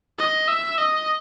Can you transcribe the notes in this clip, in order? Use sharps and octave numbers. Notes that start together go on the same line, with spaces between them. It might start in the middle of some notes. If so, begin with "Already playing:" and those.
D#5
E5
D#5